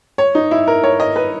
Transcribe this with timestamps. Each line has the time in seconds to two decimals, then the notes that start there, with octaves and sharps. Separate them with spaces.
0.18 C#5
0.35 D#4
0.51 E4
0.68 A#4
0.83 C#5
1.00 D#5
1.16 B4